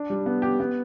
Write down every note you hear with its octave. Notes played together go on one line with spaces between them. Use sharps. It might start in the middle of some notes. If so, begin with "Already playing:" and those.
Already playing: D4
G3
B3
G4
B3